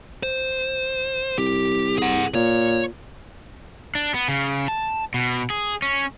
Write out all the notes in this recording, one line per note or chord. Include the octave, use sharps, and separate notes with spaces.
C5
C2 G4
G#4 F#5
A#2 C#5
D4
B3
C#3
A5
B2
G#4
C#4